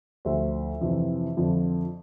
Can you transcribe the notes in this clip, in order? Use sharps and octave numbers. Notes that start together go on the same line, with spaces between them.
D2 D3 F3 C5 E5
F2 C3 E3
F2 D3 F3